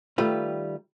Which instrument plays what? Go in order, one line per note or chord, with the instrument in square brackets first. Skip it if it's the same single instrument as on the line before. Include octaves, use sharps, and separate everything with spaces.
[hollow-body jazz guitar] D#3 G3 A3 F4 B4